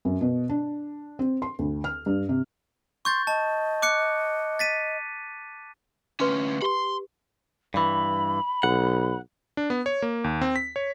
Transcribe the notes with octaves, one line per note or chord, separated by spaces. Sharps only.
F#2
B2
D4
C4
C6
D2
F6
G2
C3
C6 C#6 G6 A6
D#5 A5
D6 F#6 C#7
A6 B6 D#7
D2 C#4 B4 C6 D6
G4 B5 C6
G2 E3 B5
B1 F#5
D4
B3
C#5
A#3
D#2
C4
B6
C#5